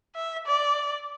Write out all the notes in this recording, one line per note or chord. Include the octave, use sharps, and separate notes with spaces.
E5
D5